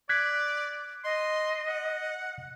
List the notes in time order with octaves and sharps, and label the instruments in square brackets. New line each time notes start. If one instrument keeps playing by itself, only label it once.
[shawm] D5 [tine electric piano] F#6 G#6 B6
[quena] D#5 [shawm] C6
[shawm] F#5